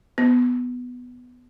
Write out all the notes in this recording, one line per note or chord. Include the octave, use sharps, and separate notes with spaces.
B3